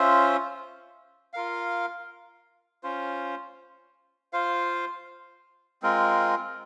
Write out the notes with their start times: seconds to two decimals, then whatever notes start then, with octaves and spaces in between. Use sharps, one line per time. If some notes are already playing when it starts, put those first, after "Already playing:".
Already playing: C#4 F4 C5 E5
1.33 F4 A#4 F5
2.83 C#4 F4 C5
4.33 F4 C5 F5
5.82 G#3 C4 F4 A#4